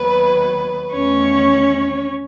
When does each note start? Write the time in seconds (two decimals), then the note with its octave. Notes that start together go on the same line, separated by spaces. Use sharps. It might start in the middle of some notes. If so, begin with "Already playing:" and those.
Already playing: D#2 D#3 F#3 B3 B4
0.93 E2 D#3 A3 C#4 C#5